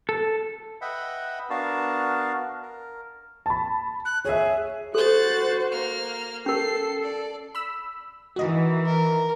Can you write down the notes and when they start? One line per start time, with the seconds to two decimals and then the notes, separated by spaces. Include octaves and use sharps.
0.09 A4
0.81 B4 D#5 E5 F#5 G5 B5
1.50 B3 D4 F#4 A#4 F5 A5
2.62 A#4
3.46 A5 B5
4.05 F#6
4.25 G#4 C#5 E5
4.95 F#4 A4 C5 F#6 A6
5.72 A#3 F6
6.46 C#4 A4 A#4 C7
7.02 D5
7.55 B5 E6
8.36 D#3 E3 F#4 D#5
8.86 A#4